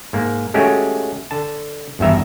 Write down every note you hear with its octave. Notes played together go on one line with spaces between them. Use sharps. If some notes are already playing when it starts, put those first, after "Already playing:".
G#2 A#3
G#3 A3 C#4 F#4 G4
D3 A5
G#1 E2 G2 E5 A#5